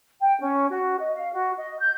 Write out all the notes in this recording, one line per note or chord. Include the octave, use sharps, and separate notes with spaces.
G5
C#4
F#4
D#5
F5
F#4
D#5
G6